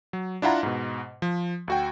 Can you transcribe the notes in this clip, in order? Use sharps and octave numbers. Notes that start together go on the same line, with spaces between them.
F#3
D4 E4 F4 F#5 A#5 B5
G#2 B2
F3
D2 F#4 G5